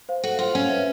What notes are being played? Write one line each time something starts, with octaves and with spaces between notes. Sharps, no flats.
C5 F5
F#4 A4
F4 C5 F5
C#4 F#4
B4 E5